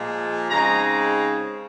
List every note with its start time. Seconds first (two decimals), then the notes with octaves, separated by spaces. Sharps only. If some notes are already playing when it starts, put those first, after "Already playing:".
Already playing: A#2 F3 G#3
0.50 C#3 G#3 C4 D#4 A#5